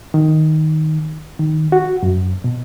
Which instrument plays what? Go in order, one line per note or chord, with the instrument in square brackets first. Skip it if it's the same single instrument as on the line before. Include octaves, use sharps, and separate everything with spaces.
[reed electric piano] D#3
D#3
F#4
F#2
B2